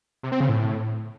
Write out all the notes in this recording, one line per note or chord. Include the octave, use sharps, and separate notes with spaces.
C3
C4
C#3
A2